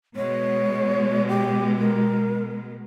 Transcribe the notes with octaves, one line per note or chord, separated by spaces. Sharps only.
B2 G#3 C#5
G4
A#4